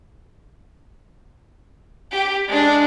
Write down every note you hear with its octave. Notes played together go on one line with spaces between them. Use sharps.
G4
G#3 D4